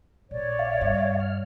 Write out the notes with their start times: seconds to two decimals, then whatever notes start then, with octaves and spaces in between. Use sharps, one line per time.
0.31 A#1 C#5 D5
0.59 E5 F5
0.81 G2
1.20 F6